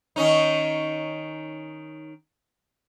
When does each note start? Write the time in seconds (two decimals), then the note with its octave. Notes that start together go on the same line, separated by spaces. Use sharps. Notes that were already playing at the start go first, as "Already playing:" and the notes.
0.16 D#3 C#4 D#4